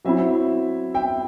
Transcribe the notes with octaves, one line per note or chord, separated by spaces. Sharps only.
F#3 C4 E4 E5
E5 G5